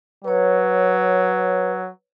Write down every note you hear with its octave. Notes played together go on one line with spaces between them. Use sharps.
F#3 B4 C#5